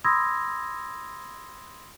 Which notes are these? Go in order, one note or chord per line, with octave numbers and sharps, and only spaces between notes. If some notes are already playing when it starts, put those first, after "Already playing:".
B5 C6 D#6 E6 G#6 A#6